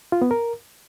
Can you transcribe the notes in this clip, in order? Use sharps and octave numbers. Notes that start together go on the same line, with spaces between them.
F4
B3
A#4